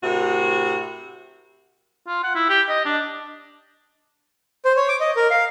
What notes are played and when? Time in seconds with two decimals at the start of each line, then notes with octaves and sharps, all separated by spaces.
0.02 A2 C3 F#4 A#4
2.07 F4
2.24 F#5
2.35 E4
2.49 G4
2.69 D#5
2.85 D4
4.65 C5
4.76 C#5
4.89 D6
5.01 D#5
5.16 A#4
5.31 F5